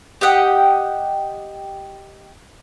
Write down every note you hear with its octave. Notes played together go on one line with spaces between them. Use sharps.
G4 D#5 F#5 G5